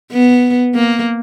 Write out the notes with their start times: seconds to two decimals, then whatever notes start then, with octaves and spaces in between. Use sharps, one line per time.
0.12 B3
0.75 A#3